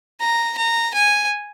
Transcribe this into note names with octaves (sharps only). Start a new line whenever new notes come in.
A#5
A#5
G#5